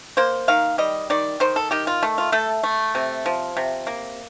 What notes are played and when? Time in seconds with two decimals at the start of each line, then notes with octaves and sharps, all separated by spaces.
0.17 A#3 C5
0.48 D#3 F5
0.78 G3 D#5
1.10 D#3 D5
1.40 D#3 C5
1.56 A4
1.71 D#3 G4
1.87 F4
2.03 A3
2.18 F4
2.32 A3 A4
2.63 A3
2.95 C3
3.26 F3
3.57 C3
3.87 A#3